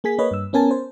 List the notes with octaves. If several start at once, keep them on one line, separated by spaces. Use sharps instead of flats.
A#3 G#4 G#5 B6
A#3 B4 C#5 D#5
G2 E6
B3 C#4 A#4 G#5 A5
C5